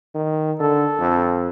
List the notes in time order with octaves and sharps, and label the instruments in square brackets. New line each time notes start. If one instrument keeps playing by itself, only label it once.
[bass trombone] D#3
[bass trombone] D3 [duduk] A4
[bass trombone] F2